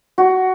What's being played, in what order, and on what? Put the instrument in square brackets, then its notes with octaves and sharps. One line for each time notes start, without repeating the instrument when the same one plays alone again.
[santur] F#4